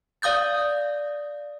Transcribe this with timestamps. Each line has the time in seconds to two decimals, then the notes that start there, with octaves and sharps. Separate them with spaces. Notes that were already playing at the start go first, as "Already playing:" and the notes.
0.22 D5 F5 D#6 G6 A6